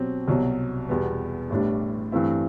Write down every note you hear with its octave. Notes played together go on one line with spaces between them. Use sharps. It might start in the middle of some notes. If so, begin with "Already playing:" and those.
Already playing: B2 F#3 C4 G4
C2 B2 F#3
E2 B2 G3 B3
A1 A2 G3 D4
G2 E3 A3 C4 E4